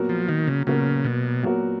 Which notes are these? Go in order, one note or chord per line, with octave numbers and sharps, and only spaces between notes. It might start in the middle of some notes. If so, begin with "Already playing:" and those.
Already playing: A#2 F#3 B3 F#4 A#4
F3
D#3
C#3
A#2 C#3 F#3 B3 F#4 A#4
B2
A#2 F#3 B3 F#4 A#4